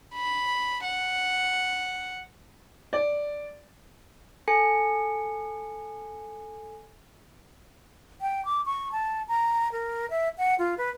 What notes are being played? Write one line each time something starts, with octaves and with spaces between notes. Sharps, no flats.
B5
F#5
D5
A4 G#5 C#7
G5
D6
C#6
A5
A#5
A#4
E5
F#5
F4
B4